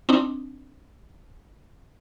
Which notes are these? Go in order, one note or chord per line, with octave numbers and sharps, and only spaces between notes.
C4 D4 D#4